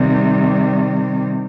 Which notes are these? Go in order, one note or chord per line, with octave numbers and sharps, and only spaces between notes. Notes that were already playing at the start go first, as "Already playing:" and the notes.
Already playing: C3 D#3 G3